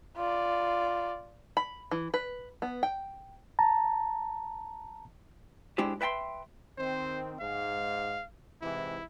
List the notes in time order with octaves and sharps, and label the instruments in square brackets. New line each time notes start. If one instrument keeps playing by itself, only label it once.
[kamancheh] F4 D5
[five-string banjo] B5
E3
B4
B3
G5
[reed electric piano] A5 A#5
[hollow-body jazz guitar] G#3 D4 E4 G4 C5
B4 E5 G5 A5 C6
[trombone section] D#3 C4 [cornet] C5
[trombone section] G#2 [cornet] F5
[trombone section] G#2 C3 E3 [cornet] E4